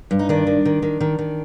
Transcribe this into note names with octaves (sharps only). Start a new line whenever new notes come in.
G2
D#4
D#3 D4
D#3
D#3
D#3
D#3
D#3